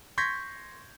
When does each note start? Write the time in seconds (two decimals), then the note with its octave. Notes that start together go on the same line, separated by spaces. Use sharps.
0.18 C6 C#6 G6 G#6 A#6 B6